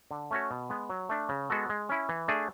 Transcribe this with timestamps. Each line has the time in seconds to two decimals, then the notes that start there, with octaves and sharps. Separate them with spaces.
0.11 D3
0.31 A3 C#4 F#4 C#5
0.51 B2
0.70 G#3 B3
0.90 F#3
1.09 A3 D4
1.29 C#3
1.50 G#3 B3 F#4 A4
1.69 G#3
1.89 C#4 E4
2.09 E3
2.28 A3 D4 G#4